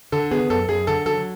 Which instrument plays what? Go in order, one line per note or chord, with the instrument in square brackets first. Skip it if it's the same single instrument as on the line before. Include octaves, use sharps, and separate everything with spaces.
[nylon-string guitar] D3 [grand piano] A4
[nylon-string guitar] B3 [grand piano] G#4
[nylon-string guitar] F#2 [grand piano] A4
[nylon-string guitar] F#2 [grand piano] G#4
[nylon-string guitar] D3 [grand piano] A4
[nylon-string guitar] F#3 [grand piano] A4